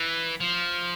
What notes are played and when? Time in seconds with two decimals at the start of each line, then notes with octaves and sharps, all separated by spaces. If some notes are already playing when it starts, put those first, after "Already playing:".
Already playing: E3
0.40 F3